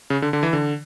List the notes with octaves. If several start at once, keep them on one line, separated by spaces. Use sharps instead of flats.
C#3
D3
D3
E3
D3